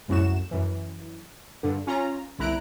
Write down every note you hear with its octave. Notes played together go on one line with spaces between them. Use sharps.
C2 F#2 A2 F#4 E7
F#2 E3
G2 D3
C#4 F4 A#5
G1 C2 E4 A#5 F#6 D7